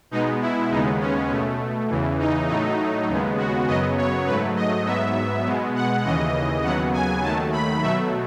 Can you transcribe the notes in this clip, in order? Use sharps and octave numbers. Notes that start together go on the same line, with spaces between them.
B2 G#3 B3 D#4
E4
D#2 C#3 G#3 B3 D#4
C#4
B2 A3
E2 C#3 E3
D#4
A2 F#3 A3 D#4
D#2 C#3 G#3 B3
F#4
F#2 C#3 F#3 B3 D#5
C#5
G#2 F#3 A3 B4
D#5
G#2 F#3 B3 E5
B2 G#3 B3
F#5
D#2 C#3 E3 D#5
D#2 C#3 F#3 B3 F#5
G#5
D#2 D#3 F#3 A3 A5
B5
B2 F#3 A3 E5